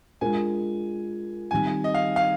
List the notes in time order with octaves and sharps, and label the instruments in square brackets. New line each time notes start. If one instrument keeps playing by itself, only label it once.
[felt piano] G#3 D4 F4 A#4 [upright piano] G#5
[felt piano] D#3 G3 C4 [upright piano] G#5
[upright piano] D#5
F5
F5